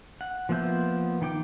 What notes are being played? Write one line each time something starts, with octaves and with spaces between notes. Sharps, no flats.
F#5
F3 A#3 B3 E5 G6
D#3 G5 D6